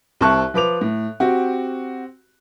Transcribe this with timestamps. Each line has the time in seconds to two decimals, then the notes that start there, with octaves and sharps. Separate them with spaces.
0.21 C2 C4 A5 C#6 F#6
0.54 F3 B4 D6 F7
0.81 A2
1.20 C4 F#4 G4